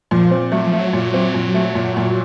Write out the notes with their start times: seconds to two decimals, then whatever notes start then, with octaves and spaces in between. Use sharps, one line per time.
0.11 A#2 F3
0.31 C4
0.52 F#3 A3
0.66 F3
0.73 A3
0.79 F#3
0.93 A#2
1.14 C4
1.34 A#2
1.54 A3
1.75 A#2
1.97 A#2